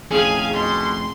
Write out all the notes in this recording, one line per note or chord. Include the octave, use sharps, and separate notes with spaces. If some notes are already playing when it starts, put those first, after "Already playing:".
F2 A2 C#4 G#4 F5 G#5
B2 C6